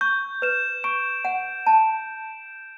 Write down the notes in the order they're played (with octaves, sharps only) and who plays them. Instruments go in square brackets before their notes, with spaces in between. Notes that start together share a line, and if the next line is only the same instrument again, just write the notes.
[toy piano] C#6 [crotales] G6
[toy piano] B4 [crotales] E7
[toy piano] C#6 [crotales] D7
[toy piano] F#5
A5